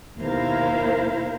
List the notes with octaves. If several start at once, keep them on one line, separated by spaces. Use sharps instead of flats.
D#2 B2 E4 A#4 C5 F5